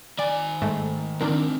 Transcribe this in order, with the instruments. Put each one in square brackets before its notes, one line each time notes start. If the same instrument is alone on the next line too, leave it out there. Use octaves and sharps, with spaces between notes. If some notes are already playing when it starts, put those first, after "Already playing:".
[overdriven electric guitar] D#3 G#5 [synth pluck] D5
[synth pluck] G#2 G#3 A3
[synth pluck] D#3 D4 A#4 [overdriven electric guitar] C4 D#4